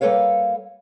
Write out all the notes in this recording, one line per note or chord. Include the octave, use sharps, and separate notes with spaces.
G3 A#3 A4 B4 C#5 F5